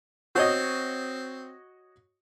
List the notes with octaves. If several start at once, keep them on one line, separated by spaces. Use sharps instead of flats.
C4 F#4 C#5 D#5